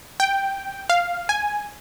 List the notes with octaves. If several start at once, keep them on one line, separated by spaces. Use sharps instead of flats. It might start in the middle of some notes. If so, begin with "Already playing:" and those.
G5
F5
G#5